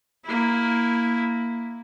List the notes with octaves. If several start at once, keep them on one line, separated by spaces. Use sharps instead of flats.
A#3 E4